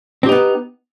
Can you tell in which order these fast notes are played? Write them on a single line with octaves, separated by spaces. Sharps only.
C4 G4 D#4 B3